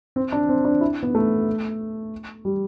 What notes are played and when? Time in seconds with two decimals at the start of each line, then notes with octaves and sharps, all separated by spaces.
0.16 C4
0.32 D4
0.49 C4
0.65 D4
0.81 E4
1.03 B3
1.15 A3
2.45 G3